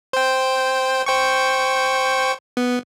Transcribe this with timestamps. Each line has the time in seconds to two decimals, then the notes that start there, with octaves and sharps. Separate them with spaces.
0.13 C5 G5
1.06 C5 G5 C#6
2.57 B3